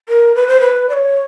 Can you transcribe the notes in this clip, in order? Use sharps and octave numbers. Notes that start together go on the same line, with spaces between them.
A#4
B4
C5
B4
D5
C#5